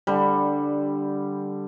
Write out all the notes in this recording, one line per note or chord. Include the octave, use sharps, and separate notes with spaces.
D3 G3